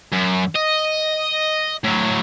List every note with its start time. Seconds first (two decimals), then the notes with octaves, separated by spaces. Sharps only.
0.12 F#2
0.55 D#5
1.84 A2 F#3